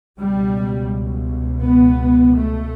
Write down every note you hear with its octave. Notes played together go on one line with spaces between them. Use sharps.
C#2 B2 G3
B3
A3